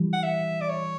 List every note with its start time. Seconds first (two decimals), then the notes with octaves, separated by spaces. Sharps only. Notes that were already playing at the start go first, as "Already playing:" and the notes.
Already playing: E3 G3
0.13 F#5
0.23 E5
0.61 D5
0.69 C#5